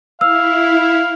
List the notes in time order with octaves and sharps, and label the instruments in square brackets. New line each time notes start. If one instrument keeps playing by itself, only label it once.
[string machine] E4 [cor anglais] F5 [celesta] E6